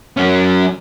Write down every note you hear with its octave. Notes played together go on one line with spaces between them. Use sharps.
F#3 C#4